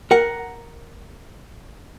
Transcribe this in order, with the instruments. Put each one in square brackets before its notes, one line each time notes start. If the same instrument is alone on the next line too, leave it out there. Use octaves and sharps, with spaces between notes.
[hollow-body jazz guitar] A#4 F#5